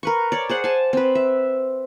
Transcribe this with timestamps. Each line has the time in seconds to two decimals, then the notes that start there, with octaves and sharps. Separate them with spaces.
0.03 A#4 B4 C#6
0.32 C#5 D5
0.49 G#4 C5 F#5
0.64 G#5 A5
0.93 C4 B4
1.15 E5